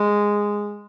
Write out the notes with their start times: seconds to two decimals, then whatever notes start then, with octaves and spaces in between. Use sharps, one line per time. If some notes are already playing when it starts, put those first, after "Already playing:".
Already playing: G#3